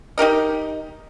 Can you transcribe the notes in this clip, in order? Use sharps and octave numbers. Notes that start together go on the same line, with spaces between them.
D#4 G4 A#4 D#5